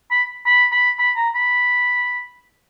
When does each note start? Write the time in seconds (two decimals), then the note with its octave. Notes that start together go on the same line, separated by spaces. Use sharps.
0.11 B5
0.46 B5
0.72 B5
0.99 B5
1.16 A#5
1.35 B5